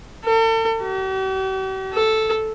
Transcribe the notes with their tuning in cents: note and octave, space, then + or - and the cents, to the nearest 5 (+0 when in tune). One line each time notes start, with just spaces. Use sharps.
A4 +40
G4 -45
A4 -5